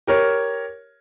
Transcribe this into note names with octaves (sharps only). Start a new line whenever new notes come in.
G4 A#4 C#5